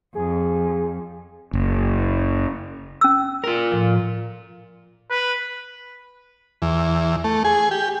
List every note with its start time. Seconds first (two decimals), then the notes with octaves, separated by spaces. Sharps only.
0.15 F2 G#4
1.53 F#1
3.01 C#4 E6
3.44 F4 A#4
3.72 A2 F3
5.10 B4
6.62 E2
7.24 A3
7.44 G#4
7.71 G4